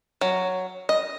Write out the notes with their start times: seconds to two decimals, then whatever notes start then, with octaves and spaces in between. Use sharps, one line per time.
0.21 F#3
0.89 D#5